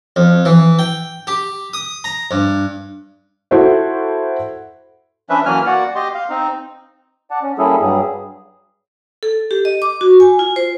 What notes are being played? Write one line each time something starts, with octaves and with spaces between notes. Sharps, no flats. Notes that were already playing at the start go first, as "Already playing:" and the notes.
F2
E3
G5
G4
D#6
A#5
G2
E4 F#4 A4 C5 F#5
F3 C#4 D4 B4 E5
E3 F#3 A#3 C#4 G#5 F6
A#3 F#4 D5 F#5
G4 D#5 C6
F5
C4 D#4
D5 F#5 A5
C#4
G3 A#3 C#4 E4 G#4 A4
G2 F#3 G3 G#4
A4
G4
D#5
D6
F#4
G#5
F4
C5